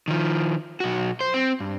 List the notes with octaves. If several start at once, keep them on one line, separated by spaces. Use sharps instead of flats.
D#3 F3
B1 F#4
C5
C4
G2